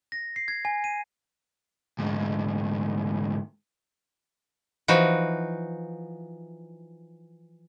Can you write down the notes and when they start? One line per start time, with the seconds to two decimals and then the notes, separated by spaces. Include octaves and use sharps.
0.12 A#6
0.36 C7
0.48 G#6
0.65 G#5
0.84 D#7
1.99 D2 G#2
4.88 E3 F3 D#4 F#4